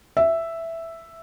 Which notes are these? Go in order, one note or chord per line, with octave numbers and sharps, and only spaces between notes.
E5